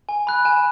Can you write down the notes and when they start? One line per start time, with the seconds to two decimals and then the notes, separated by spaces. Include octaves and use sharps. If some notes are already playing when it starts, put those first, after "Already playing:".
0.09 G#5
0.27 B5 F#6
0.45 G#5 E7